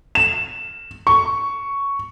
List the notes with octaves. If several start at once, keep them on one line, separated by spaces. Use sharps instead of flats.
E7
C#6